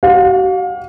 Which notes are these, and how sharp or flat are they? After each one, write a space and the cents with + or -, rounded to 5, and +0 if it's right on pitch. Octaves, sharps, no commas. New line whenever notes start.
F#4 +45 F5 +35